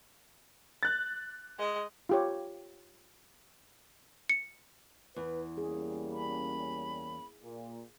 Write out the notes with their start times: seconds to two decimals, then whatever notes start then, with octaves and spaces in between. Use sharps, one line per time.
0.83 F#6 A6
1.58 G#3 D#5
2.09 F4 G4 C#5
4.29 C#7
5.16 E2 B4
5.58 G3 A#3 C#4 G#4
6.13 B5
7.43 A#2